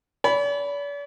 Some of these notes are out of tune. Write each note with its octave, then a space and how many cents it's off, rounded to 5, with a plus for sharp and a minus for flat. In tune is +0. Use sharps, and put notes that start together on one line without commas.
D5 -45 B5 +0